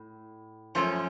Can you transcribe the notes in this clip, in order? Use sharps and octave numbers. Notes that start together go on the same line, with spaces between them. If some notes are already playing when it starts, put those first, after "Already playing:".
Already playing: A2
F#2 F3 A3 C#4